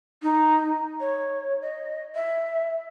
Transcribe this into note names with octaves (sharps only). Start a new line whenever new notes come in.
D#4
C#5
D#5
E5